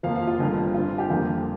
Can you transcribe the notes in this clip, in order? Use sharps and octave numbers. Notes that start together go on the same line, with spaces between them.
F2 F3 A#3 F5
F5
F4
F1 F2 D3 G3 A#3
G2 G3 C4 F4
G4
F2 D3 G3 A#3 F4